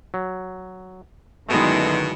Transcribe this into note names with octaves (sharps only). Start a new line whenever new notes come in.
F#3
F#2 B2 D3 D#3 G#3 A3 E4 G#4